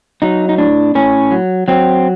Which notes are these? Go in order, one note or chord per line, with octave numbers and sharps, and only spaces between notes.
F#3 D#4
D#4
A2 D4
A2 C#4
F#3
F#3 C4